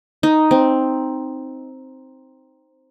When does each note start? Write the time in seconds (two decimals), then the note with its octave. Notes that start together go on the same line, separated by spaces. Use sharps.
0.23 D#4
0.51 C4